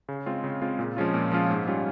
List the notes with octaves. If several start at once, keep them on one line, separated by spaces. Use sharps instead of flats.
C#3
G#3 C4 F4
C#3
G#3 C4 F4
A#2
F3 G#3 C#4 F4
A#2
F3 G#3 C#4 F4
G#2
G3 C#4 F4